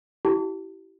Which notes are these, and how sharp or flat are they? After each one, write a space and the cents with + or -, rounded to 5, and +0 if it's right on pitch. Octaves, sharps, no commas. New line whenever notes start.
E4 +0 G4 -35 A5 +25